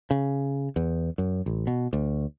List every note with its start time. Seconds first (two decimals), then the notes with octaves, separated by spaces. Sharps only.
0.11 C#3
0.76 E2
1.18 F#2
1.46 A1
1.67 B2
1.93 D2